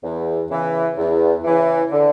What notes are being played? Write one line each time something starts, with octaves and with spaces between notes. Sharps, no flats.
E2
C#3 E3
E2
C#3 E3
D3